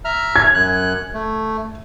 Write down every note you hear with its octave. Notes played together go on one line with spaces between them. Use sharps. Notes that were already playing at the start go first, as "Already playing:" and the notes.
E5 A#5 F6
G#6
F#2 F#6
A3